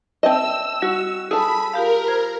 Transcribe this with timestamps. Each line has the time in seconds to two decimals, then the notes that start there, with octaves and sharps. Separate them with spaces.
0.23 C4 D#5 E5 G5 A5 E6
0.82 G3 F#4
1.31 G#4 A4 B5
1.73 F4 G4 A#4 F5
2.08 C5 G#6